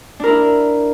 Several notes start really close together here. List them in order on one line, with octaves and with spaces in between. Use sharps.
D4 A#4 E4